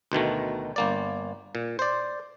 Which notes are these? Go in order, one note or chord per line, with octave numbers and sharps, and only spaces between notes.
D2 B2 D#3 A3
G1 A#3 D5
A#2
C5 D5